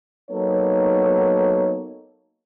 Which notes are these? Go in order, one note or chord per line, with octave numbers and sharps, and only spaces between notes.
F#3 A#3 B3 D#4 A4 C#5